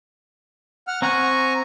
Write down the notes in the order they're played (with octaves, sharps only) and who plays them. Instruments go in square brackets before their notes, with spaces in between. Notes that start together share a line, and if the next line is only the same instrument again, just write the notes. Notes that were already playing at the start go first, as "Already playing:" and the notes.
[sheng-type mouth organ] F#5 F6
[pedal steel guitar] C4 F#5 F#6 [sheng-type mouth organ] G#5 A#5 C#6